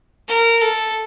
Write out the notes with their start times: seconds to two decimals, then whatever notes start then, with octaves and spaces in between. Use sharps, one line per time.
0.28 A#4
0.62 A4